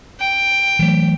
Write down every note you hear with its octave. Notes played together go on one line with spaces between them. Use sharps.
G5
E3 F#3 A3